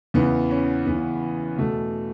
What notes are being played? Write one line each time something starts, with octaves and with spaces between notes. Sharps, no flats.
E2 C#3 E3 B3
C#4
E2 C#3 E3 B3
E2 B2 A3